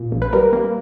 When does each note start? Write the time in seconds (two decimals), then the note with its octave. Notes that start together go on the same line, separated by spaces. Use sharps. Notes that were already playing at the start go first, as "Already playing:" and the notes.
Already playing: A#2
0.12 A#1
0.22 B4
0.33 G3 A#4
0.53 A#3